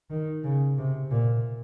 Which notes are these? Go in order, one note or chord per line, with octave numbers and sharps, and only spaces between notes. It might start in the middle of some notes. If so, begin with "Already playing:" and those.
D#3
C#3
C3
A#2